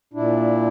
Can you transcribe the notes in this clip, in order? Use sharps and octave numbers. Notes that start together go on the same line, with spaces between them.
A#2 D4 E4